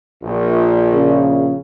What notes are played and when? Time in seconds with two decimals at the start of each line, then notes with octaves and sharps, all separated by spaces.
0.22 A#1
0.93 C#3